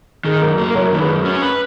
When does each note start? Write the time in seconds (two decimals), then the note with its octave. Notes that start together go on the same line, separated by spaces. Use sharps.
0.25 D#3 G#4
0.35 G#4
0.42 F#2 A#4
0.58 A#3 A#4
0.74 F#2 A#4 C#5
0.92 D#3
1.00 G#4 B4
1.08 F#2
1.25 C#4
1.42 B4